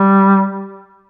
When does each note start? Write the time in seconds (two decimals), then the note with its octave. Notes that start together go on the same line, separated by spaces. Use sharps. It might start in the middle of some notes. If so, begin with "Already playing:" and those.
Already playing: G3